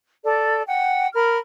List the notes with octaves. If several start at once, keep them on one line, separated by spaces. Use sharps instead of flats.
A4 D5
F#5 G5
A#4 B5 F6